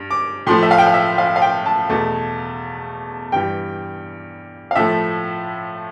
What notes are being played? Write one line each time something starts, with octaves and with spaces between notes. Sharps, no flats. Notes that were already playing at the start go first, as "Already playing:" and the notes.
Already playing: G2
D6
A2 F3 A3 C6
E5
F5
G5
F5
E5
F5
F5
G5
A5
E2 B2 A3
G2 E3 G3 G5
F5
A2 F3 A3 E5